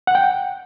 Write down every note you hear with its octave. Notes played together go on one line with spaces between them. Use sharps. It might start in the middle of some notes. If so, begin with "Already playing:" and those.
F#5
G5